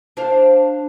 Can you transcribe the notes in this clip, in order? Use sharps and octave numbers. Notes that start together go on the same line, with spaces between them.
D4 C5 F5